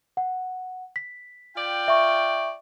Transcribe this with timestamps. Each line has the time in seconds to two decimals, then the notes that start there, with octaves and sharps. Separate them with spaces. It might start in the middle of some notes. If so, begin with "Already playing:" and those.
0.17 F#5
0.96 B6
1.56 F4 D5 G5
1.88 E5 C#6